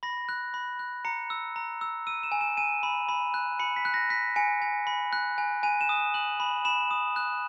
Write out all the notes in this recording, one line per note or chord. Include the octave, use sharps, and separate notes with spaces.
B5 A#6
F#6
B5
F#6
A#5 C#7
E6
A#5
E6
E6 D#7
E7
G#5
E7
G#5 D#7
B5
B5
F#6
B5 C#7
B6
F#6
A#6
F#6 B6
G#5 C#7
G#5
B5
F#6
G#5
G#5 D#7
E7
D#6
E7
F#6 F#7
B5
B5 E7
D#6
F#6